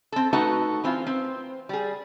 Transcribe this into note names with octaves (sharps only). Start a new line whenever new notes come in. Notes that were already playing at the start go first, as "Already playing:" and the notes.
C4 A4
A3 D#4 F#4 A4 B4 F#5
E3 C4 F4
C4
G3 G#4